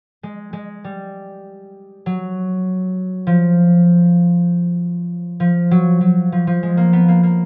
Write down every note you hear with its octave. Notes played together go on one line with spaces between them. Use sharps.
G#3
G#3
G3
F#3
F3
F3
F#3
F#3
F3
F3
G#3
A#3
B3
A#3
A#3